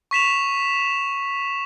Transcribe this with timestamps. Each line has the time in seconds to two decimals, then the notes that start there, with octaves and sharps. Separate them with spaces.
0.11 C#6 B6 E7 F7